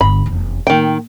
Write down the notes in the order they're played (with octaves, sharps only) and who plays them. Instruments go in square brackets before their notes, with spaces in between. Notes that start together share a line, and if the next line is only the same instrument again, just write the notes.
[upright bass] G1 G2 [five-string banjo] B5
[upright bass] F1 E2
[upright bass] A2 A#3 [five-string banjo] D#3 G5